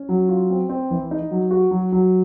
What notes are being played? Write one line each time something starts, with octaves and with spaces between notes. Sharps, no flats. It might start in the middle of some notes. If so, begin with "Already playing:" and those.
Already playing: C#4
F#3
F4
C4
C4
E3
D#4
F#3
F#4
F#3
F#3